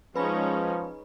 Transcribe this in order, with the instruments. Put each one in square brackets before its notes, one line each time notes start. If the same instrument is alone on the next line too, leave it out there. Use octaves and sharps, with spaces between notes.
[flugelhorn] F3 [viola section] G#3 C#4 D#4 [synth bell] B4 B5